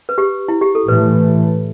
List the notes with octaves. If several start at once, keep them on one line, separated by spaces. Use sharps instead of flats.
B4
G4
E4
G4
A4
A2 E3 A3 B4